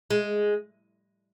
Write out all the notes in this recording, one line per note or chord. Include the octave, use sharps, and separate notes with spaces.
G#3